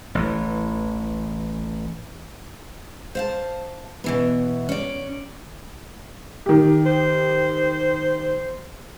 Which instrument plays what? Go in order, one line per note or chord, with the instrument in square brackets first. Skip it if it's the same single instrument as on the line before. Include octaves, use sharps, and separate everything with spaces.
[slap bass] A1 E3
[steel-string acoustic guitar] C5 F5 A5
B2 E3 B3
C#4 D5
[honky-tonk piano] D#3 G4
[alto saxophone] C5